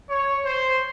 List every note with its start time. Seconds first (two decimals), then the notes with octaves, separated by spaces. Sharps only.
0.09 C#5
0.45 C5